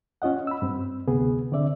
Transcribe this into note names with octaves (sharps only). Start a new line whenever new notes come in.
C#4 F4 D#5 F#5
B5 E6
G2 C4
D2 C3 B3 G#4
D3 C4 D5 E5